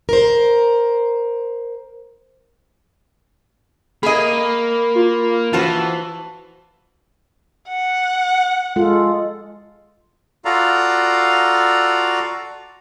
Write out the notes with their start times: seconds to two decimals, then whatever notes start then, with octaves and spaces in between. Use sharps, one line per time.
0.09 A#4 C5
4.03 A#3 G#4 D#5 B5
4.95 F4
5.53 E3 F4 F#4 C5 A5
7.69 F#5
8.76 G#3 F4 A4
10.45 F4 F#4 A4 D5 F5 A#5